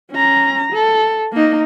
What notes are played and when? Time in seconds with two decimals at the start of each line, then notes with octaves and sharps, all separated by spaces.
0.11 C#4 A#5
0.73 A4
1.33 A#3 D#4